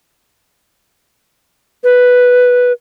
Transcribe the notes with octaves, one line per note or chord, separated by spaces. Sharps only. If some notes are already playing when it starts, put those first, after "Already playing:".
B4